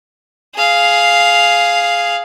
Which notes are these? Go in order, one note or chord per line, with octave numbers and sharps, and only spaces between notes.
G#4 F5